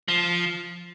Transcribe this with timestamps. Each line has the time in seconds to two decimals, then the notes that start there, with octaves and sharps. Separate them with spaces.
0.08 F3